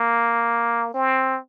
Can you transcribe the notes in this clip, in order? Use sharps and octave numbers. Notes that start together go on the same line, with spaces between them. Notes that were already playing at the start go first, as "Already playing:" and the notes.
Already playing: A#3
C4